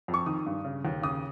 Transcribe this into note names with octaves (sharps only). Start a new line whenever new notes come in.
F2
C#6
D#3 D#6
G2
C#3
D#2
C#3 D#6